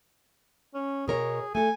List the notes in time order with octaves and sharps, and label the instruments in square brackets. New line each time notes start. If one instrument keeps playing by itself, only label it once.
[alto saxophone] C#4
[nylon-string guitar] B2 A#4 C#5 [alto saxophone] G#4
[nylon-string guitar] A3 A4 [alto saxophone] G#5